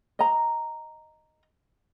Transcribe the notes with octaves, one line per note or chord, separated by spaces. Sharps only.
D#5 A#5